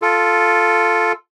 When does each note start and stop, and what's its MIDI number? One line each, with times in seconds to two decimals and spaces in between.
0.02 1.12 65
0.02 1.12 69